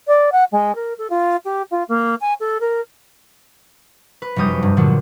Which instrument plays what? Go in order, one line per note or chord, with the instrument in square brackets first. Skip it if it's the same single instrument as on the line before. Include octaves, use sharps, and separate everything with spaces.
[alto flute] D5
F#5
G#3
A#4
A4
F4
G4
F4
A#3
G#5
A4
A#4
[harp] B4
F1 F#2 G3 D#6 G6
G2
A#2 D3 F3 F#3 D4